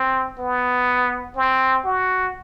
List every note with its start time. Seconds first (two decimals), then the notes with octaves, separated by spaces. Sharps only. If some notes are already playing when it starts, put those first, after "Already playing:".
Already playing: C4
0.39 B3
1.36 C4
1.85 F#4